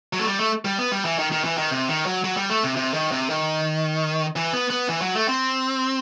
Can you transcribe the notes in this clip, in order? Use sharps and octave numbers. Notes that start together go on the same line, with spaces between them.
F#3
A3
G3
A3
G3
B3
G3
E3
D#3
D#3
E3
D#3
C3
D#3
F#3
F#3
G3
A3
C3
C3
D#3
C3
D#3
E3
B3
B3
E3
F#3
A3
C4